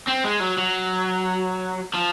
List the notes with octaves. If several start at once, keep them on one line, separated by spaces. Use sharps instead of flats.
C4
G#3
F#3
F#3
F3